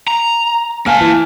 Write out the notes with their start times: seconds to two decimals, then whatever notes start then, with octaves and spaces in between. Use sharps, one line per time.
0.08 A#5
0.86 A#3 F5 G#5 A5 F6
1.01 E3